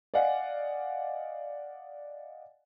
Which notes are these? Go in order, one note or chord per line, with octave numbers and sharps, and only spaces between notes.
D5 D#5 F5 F#5 G#5